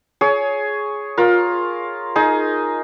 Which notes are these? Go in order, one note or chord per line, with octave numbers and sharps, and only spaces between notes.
G#4 C#5
F4 A#4
D#4 G#4